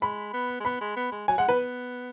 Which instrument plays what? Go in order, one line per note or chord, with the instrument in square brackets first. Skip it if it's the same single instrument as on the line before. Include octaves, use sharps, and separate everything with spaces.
[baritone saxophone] G#3 [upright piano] B5
[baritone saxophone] B3
G#3
[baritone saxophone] B3 [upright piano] B5
[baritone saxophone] G#3
B3
G#3
[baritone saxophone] F#3 [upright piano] G#5
[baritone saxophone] G#3 [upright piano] F#5
[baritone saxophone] B3 [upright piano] B4